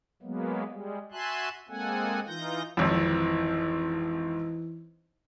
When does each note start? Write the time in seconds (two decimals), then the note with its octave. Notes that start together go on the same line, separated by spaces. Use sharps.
0.22 F#3 G#3 A#3 B3
0.68 G3 G#3
1.12 F#4 E5 G#5 A5 C6 F#6
1.69 G#3 A#3 C4 A4 F#5 G#5
2.27 E3 D#4 F4 G6 A#6
2.77 G#1 F2 E3